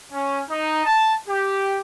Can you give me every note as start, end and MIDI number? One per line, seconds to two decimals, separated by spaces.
0.13 0.39 61
0.49 0.83 63
0.85 1.13 81
1.28 1.80 67